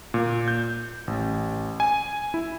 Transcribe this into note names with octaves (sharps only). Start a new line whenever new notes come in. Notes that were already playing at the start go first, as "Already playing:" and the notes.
A#2
G6
A1
G#5
E4